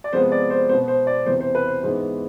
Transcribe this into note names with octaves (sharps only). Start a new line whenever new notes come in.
D5
C3 F3 G#3 B3 C5
D5
C5
B2 B3 C5
C5
D5
E2 C3 E3 C5
C5
B4
C5
G#2 E3 G#3 B3 C5